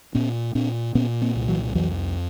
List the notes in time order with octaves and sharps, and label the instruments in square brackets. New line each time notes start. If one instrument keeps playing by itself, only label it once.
[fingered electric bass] A#2 B3 C#4
A#2 C4 D4
A#2 B3 C#4
A#3 C4
C2
E3 F#3
F2 E3 F#3